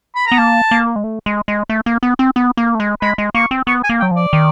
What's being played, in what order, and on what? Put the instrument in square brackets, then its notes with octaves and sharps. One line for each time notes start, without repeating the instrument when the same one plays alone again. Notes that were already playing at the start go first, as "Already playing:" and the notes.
[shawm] B5
[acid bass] B3 [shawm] A#5
[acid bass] A#3 [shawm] A5
[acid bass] A#3
G#3
A3
G#3
G#3
A3
A#3
B3
C4
B3
A#3
A3
G#3
[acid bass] G#3 [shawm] B5
[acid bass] G#3
[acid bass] A#3 [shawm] C#6
[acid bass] C4
[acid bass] B3 [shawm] C#6
[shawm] G#5
[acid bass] A#3
[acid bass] F#3 [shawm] G5
[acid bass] F3
[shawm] D5
[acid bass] D#3